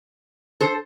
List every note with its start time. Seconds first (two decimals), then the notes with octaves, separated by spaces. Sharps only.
0.61 A4 C5